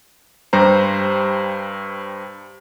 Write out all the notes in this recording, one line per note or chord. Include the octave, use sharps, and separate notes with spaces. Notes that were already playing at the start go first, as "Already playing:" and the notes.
G2 G3 C5 A#5